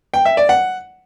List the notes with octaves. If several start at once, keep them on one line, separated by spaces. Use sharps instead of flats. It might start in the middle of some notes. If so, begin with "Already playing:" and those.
G5
E5
D5
F#5